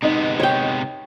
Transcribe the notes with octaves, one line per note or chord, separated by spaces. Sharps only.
C3 G#3 B3 D#4 D#5
C#5 G5